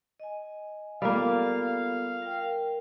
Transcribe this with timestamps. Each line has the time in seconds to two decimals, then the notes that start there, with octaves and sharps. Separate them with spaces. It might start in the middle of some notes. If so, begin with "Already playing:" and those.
0.20 D#5 G#5
1.02 G3 A#3 B3 F4 A4 F5
2.22 A#4 G5